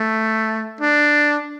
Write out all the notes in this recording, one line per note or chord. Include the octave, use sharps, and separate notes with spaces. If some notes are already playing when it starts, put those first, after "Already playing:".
Already playing: A3
D4